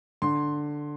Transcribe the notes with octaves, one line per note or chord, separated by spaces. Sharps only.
D3 C6